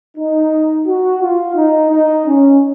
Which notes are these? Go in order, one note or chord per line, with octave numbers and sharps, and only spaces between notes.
D#4
F#4
F4
D#4
D#4
C#4